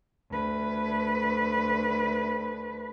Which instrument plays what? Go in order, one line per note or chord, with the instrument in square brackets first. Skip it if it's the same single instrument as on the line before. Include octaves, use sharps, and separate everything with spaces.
[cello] D2 B4